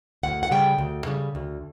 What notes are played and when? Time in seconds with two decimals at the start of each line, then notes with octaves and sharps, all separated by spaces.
0.23 D2 F#5
0.43 F#5
0.51 C#3 G3 G5
0.78 D2
1.06 C#3 G3
1.35 D2